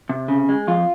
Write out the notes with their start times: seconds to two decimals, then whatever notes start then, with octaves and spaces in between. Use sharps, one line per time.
0.09 C3
0.28 C#3
0.49 G#3
0.67 F2 F4